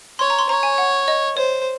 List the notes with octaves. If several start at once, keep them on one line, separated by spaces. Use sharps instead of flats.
C#5 C6
A#5
C6
C#5 A#5
G#5
F#5
D#5
C5 C#5